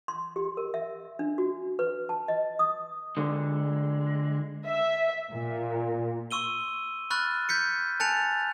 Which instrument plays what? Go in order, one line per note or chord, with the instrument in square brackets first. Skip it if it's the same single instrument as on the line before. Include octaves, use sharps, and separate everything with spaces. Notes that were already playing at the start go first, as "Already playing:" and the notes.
[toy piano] C6
G4
A#4
E5
D4
F#4
B4
A5
D#5
D#6
[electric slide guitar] D3 G#3
[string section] E5
A#2
[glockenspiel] C6 C#6 E6 D#7 G7
B5 C#6 F6 F#6 A6
G6 B6 C#7
G#5 A5 F#6 A6 C#7 F7